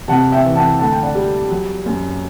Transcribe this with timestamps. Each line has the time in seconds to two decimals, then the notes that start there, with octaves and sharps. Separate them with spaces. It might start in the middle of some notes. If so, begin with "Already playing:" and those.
0.08 C3 F#5 A5
0.32 E5 G5
0.44 E3
0.55 F#5 A5
0.79 D2 F#5 A5
0.92 G5
1.03 D5 F#5
1.15 G3
1.50 F#3
1.86 F#2